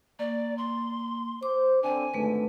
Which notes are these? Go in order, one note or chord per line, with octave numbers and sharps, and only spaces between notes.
A#3 D5
C6
C5 D6
D3 C4 G#5
G#1 D3 A3 B4